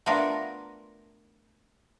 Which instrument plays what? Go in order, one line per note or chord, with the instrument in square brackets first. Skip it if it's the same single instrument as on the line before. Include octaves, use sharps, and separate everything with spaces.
[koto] A3 B3 D4 F4 A#4